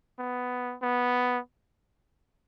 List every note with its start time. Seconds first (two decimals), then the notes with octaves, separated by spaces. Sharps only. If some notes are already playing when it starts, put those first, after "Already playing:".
0.19 B3
0.82 B3